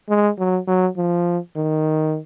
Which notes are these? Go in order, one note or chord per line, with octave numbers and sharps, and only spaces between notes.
G#3
F#3
F#3
F3
D#3